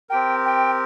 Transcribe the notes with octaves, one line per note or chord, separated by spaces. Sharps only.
C4 G4 A#4 G5
G5